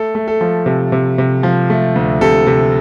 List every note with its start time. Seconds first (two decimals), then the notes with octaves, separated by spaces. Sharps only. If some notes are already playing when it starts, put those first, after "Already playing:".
Already playing: A3 A4
0.15 A3
0.28 A4
0.41 F3
0.66 C3
0.92 C3
1.18 C3
1.43 F3
1.70 A3
1.95 D2
2.21 C3 A4
2.47 C3